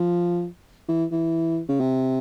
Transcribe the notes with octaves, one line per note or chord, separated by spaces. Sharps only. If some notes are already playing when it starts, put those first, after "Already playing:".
Already playing: F3
E3
E3
C#3
C3